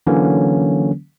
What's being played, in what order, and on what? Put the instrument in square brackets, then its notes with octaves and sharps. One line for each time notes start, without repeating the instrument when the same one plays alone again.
[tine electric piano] D3 E3 F#3 A#3 C#4